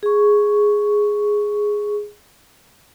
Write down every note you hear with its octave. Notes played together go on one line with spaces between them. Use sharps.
G#4 C#6